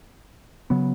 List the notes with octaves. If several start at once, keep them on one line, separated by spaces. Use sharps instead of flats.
C#3 F#3 B3